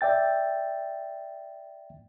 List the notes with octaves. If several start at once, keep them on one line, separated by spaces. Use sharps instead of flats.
D5 E5 G5 A6